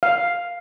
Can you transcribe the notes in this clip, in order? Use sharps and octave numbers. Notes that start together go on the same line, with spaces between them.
F5